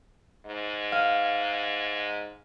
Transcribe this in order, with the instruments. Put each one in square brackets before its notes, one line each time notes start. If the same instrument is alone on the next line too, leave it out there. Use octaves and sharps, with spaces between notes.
[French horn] G#2
[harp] F5